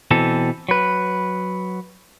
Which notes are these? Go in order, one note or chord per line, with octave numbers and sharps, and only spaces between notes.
B2 E3 C4 A4
F#3 B4